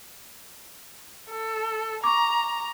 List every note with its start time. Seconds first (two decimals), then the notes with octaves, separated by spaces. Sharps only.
1.29 A4
2.04 A#5 C#6 D6